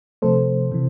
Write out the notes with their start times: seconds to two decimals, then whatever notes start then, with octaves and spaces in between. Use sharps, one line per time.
0.22 C3 F3 A3 A4 C5
0.72 C3 E3